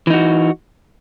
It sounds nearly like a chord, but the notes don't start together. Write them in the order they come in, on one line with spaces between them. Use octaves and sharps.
E3 D#4 F#4